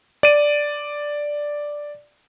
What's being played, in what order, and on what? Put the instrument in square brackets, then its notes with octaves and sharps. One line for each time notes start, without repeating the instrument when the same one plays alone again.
[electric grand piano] D5 D#7